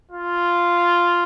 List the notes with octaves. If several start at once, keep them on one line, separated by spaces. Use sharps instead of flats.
F4